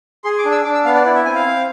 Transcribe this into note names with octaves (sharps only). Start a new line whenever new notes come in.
G#4 C6
D6
D4
E6
D4 D6
E6
B3 F5
D5
E4 D5
E5
C4 G#5
F5
C4